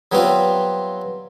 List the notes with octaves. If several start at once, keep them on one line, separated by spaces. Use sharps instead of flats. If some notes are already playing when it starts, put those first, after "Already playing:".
F#3 G3 B3 C4 F4 F#4